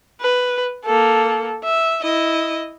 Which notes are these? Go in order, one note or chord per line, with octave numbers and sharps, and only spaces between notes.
B4
A#3 A4
E5
E4 D#5